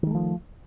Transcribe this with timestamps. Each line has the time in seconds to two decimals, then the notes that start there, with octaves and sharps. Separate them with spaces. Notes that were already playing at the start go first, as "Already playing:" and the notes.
0.03 D#3
0.07 G#3
0.11 A3
0.15 F3